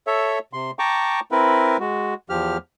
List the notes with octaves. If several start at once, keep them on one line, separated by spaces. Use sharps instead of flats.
A4 C#5 E5
C3 C6
G5 A5 A#5 C#6 D6
C4 E4 A#4 B4
G#3 F#4
E2 F3 G4 F6